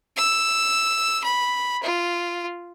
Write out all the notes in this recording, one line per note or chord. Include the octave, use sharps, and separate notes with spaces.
E6
B5
F4